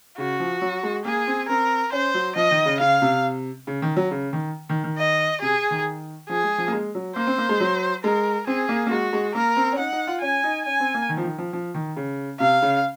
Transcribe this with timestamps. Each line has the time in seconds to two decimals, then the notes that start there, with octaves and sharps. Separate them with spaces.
0.18 C#3 F#4
0.40 F3
0.61 F#3
0.83 G#3
1.05 A#3 G#4
1.27 C4
1.49 C4 A#4
1.92 C#4 C5
2.14 F#3
2.36 F3 D#5
2.51 D#3
2.66 C#3
2.80 C#3 F5
3.02 C3
3.67 C#3
3.82 D#3
3.96 F#3
4.11 C#3
4.33 D#3
4.69 D#3
4.84 D#3
4.98 D#5
5.42 C3 G#4
5.71 D#3
6.29 F3 G#4
6.43 G#3
6.58 F3
6.68 A#3
6.72 G#3
6.95 F#3
7.16 A#3 C5
7.27 C4
7.38 A#3
7.49 G#3
7.60 F#3
8.04 G#3 A#4
8.47 C4 G#4
8.69 A#3
8.87 A#3
8.91 G#3 F#4
9.13 G#3
9.35 A#3 A#4
9.57 C4
9.73 C#4
9.78 D#4 F#5
9.92 D#4
10.07 F4
10.22 C#4 G#5
10.44 D#4
10.66 C#4 G#5
10.80 C4
10.94 A#3
11.09 D#3
11.17 F3
11.23 D#3
11.38 F3
11.53 F3
11.74 D#3
11.96 C#3
12.40 C3 F5
12.62 C#3